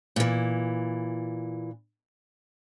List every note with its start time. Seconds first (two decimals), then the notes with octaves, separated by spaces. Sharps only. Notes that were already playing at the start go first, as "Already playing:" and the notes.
0.16 A#2 E3